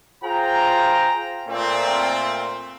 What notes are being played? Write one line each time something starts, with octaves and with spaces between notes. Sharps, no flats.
F4 G#4 C5 G5 A#5
A#2 A3 C4